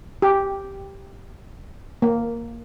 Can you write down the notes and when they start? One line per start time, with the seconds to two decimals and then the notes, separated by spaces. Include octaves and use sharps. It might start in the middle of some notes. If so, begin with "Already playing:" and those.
0.22 G4
2.02 A#3